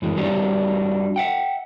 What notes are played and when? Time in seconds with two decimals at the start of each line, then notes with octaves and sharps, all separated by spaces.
0.02 F#2 E3 G#3
0.17 F#3 G3 D4 D#4 F4 G4
1.16 E5 F#5 G5